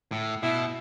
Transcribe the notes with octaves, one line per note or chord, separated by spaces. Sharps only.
A2
B2 E4